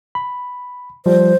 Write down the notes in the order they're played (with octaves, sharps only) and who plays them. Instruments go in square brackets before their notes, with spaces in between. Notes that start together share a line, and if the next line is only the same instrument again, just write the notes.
[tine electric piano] B5
[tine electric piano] F3 G3 [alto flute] C5